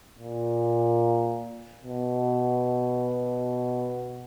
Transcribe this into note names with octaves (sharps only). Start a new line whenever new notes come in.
A#2
B2